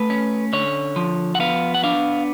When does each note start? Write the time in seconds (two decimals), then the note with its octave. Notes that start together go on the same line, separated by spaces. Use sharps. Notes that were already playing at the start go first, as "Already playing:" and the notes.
Already playing: A3 B4
0.10 C#4
0.53 D3 C#5
0.96 F3
1.35 F#5
1.40 B3 F5
1.74 F#5
1.84 D4 F5